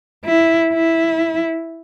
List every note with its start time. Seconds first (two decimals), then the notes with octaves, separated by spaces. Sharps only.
0.25 E4
0.73 E4